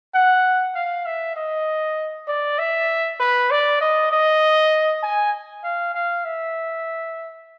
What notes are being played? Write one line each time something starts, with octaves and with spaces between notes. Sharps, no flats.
F#5
F5
E5
D#5
D5
E5
B4
D5
D#5
D#5
G#5
F5
F5
E5